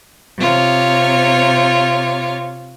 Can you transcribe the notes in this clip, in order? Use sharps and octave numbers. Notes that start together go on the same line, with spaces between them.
C3 F4 C#5